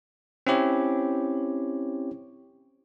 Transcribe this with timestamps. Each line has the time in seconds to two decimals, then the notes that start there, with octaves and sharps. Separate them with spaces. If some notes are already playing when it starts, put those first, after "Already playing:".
0.47 C4 C#4 E4 G4 C#5